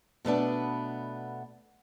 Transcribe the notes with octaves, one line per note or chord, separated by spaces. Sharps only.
B2 A3 B3 D4